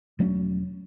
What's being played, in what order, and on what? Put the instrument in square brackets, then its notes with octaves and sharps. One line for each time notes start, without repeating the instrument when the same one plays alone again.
[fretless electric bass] E1 F#3 A3 C#4